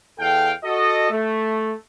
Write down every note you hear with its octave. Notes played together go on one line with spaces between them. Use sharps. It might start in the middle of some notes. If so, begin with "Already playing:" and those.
E2 A4 F5 G5
F#4 A4 D#5
A3